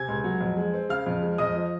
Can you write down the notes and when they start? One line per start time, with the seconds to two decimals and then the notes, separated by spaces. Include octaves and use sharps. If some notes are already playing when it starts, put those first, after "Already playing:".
Already playing: C3 G#5 G#6
0.08 C#2
0.24 F#3
0.41 F2
0.57 G#3
0.74 C4
0.89 C#3 F5 F6
1.07 F2
1.23 G#3
1.38 F2 D#5 D#6
1.55 F3